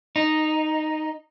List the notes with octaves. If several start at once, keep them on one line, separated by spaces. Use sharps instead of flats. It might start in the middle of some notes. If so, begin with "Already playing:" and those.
D#4